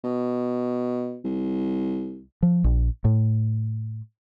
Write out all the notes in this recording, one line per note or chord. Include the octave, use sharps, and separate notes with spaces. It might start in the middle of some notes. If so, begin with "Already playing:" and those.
B2
C2
F3
A#1
A2